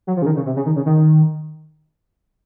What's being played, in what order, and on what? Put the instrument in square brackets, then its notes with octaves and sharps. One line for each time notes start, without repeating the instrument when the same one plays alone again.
[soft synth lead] F#3
F3
C#3
D#3
C#3
C3
C#3
D#3
C#3
D#3